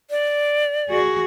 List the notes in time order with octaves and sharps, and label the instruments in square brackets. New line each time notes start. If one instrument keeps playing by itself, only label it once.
[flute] D5
[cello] F#4 G#4